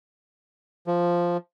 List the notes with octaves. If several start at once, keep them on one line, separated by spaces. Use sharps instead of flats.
F3